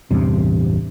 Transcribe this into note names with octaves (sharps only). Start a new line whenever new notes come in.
A1 E2 G2 C3